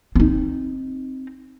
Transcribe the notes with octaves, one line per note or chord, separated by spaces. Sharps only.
C4 D#4